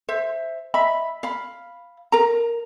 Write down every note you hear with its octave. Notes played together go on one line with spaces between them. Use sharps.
C5 E5
D#5 E5 B5
F5 B5
A#4 A#5